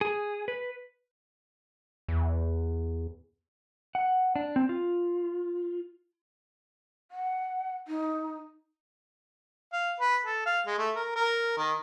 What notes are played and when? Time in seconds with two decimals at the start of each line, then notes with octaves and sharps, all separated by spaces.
0.01 G#4
0.48 B4
2.08 E2
3.95 F#5
4.36 D4
4.56 C4
4.69 F4
7.11 F#5
7.88 D#4
9.73 F5
10.00 B4
10.25 A4
10.46 F5
10.67 G#3
10.78 A3
10.96 A#4
11.16 A#4
11.57 D#3